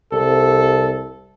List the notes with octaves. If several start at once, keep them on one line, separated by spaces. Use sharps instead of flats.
C2 A4